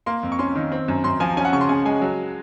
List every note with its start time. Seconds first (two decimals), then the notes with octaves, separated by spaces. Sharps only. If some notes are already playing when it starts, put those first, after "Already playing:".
0.06 A#3 C6
0.23 F2
0.32 C#6
0.39 C#4 C6
0.55 D#3
0.72 C4
0.88 F#2
1.04 F#2 C6
1.20 F3 G#5
1.37 C#4 G#5
1.45 F#5
1.52 C#3 C#6
1.61 C6
1.69 C#3 G#5
1.85 G#3 G#5
2.02 F#3